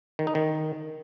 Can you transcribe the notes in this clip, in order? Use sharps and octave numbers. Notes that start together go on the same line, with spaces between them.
D#3
D#4
D#3